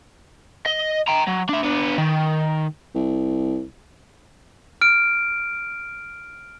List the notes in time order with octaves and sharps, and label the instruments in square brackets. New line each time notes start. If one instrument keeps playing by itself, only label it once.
[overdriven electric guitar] D#5
G5 A#5
F#3
D4 E5
B3 D4
D#3
[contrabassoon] C2
[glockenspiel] F6 D7